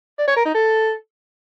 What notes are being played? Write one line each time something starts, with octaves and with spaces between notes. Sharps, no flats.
D5
C#5
A#4
D#4
A4